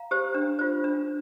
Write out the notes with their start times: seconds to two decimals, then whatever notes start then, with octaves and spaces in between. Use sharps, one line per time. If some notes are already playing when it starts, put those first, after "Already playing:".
Already playing: F5 A#5
0.11 G4 C5
0.34 D4
0.59 F4 C5
0.84 D4